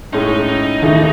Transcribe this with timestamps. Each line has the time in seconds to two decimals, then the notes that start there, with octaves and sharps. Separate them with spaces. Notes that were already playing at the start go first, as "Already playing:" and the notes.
0.13 A2 G#3 C#4 D#4
0.48 D#4
0.82 D#2 D#3 A3 E4 G#4